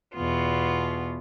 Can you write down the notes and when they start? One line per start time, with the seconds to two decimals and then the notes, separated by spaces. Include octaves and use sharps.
0.14 E2 B2 B3 F4